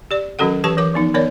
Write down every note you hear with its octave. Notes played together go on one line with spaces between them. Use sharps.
G4 D5
D#3 F#3 C#4 F#4 A4 F#5
E3 G4 B4 A5 C#6
E3 A#4 D6
F3 B3 D#4
D#3 B3 A#4 C#5 D5